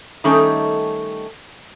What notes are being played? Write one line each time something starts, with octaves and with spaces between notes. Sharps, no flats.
D#3 G3 A3 C#4 D#4 A4